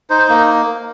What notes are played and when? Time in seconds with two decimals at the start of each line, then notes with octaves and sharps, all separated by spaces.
0.10 D#4 C5
0.29 A#3